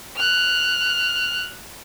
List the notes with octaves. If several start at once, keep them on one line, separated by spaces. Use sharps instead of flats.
F6 F#6